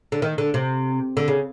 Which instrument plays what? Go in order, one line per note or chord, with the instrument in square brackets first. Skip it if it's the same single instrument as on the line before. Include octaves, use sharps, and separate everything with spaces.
[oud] D3
D#3
D3
C3
D3
C#3